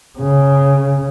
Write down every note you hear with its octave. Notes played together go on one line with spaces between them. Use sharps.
C#3